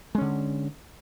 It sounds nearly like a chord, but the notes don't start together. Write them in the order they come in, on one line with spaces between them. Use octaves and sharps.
G#3 C#4 D3